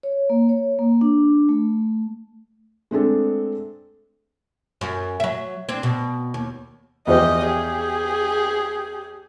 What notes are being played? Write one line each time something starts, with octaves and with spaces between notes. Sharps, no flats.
C#5
A#3
C#5
A#3
D4
A3
G#3 A3 C4 D4 G#4 A4
F#2
F#3 E5
C4 D4
B2
D#2
E2 F3 G4 C5 D#5
G4 G#4